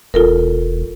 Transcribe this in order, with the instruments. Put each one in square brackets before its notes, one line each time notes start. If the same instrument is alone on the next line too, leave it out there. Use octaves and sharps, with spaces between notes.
[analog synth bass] E1 [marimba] F4 A4 A#4